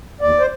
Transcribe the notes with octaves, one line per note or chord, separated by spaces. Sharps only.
D#2 D5
C5